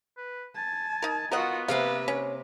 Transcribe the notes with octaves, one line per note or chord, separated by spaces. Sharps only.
B4
G#5 A5
D#4 A#4
B3 F4 F#4 A#4 D#5 F#5
C3 A#3 C4 B4 F5
C#4